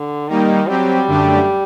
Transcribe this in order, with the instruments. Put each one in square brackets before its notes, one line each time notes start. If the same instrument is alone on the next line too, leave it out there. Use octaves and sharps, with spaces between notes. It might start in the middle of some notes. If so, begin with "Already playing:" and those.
Already playing: [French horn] D3
[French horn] D#3 [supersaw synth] G3 A#3 D#4
[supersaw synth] F#3 C4 G4 [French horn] G3
[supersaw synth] F#2 D3 A3 D4 G4